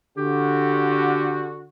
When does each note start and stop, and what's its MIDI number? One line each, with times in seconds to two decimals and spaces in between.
0.17 1.67 50
0.17 1.67 66
0.17 1.54 67